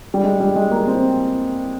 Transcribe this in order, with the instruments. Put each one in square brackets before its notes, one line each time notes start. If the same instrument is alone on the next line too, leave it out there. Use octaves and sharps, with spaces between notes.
[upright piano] G3
G#3
G3
G#3
A#3
C4